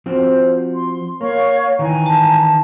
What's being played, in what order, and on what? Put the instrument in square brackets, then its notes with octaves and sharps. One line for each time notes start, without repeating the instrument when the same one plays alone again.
[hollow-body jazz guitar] F3 C4 F#4 [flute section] C5
[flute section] C6
[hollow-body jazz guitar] A#3 [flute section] C#5 F5 C#6
[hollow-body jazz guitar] D#3 E3 [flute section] G#5 A#5
[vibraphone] A5